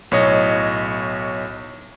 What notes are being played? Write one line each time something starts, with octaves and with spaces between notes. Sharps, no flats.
B1 A2 C#5 D#5